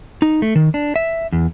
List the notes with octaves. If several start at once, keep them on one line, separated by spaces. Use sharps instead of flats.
D#4
A3
D#3
D4
E5
E2